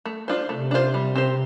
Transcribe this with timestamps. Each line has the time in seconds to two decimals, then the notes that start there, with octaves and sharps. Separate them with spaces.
0.05 A3
0.28 D4 F4 C5
0.49 C3 A3
0.71 D4 F4 C5
0.94 G3
1.15 C4 G4 C5